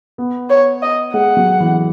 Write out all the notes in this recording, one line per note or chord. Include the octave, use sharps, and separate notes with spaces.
B3
C#5
D#5
G#3 F#5
F#3
E3